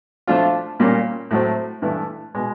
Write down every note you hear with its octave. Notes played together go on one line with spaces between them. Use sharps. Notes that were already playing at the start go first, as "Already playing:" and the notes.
F3 A3 D4 F4
A#2 G3 A#3 C#4
A2 F#3 A3 C4
G2 E3 A3
B2 G#3